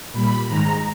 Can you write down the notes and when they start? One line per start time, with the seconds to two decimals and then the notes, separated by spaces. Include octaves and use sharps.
0.12 A#2 G3 B5
0.47 G#2 D#3 G#3 A#5